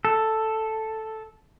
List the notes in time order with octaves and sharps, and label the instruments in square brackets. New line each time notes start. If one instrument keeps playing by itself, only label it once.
[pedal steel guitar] A4